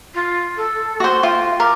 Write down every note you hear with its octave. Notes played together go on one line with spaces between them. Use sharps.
F4
A4
F#4 C5
F4 G5
A#4 D6